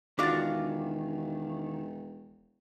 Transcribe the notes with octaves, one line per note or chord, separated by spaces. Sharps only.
E1 D#3 D4 F4 F#4 D6 A6